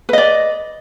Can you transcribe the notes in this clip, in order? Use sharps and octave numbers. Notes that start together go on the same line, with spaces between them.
B4 D5 D#5